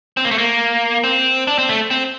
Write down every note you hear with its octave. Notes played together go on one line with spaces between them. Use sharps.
C4
A#3
A3
A#3
C4
D4
C4
A3
C4